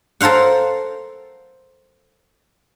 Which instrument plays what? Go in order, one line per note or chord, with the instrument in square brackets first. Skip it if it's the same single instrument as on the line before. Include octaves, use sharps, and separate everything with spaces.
[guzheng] A4 A#4 C5 F5 F#5